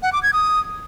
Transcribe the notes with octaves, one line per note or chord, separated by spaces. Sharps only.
F#5
D6
G#6
D#6